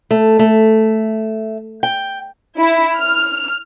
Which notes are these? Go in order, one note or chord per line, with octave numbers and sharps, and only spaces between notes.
A3
A3
G5
E4
F6